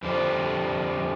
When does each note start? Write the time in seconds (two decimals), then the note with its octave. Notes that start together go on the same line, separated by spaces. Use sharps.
0.03 F2 D3 G3 C4 F4